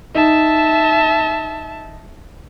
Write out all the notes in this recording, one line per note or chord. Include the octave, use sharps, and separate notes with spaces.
D#4 E5 A5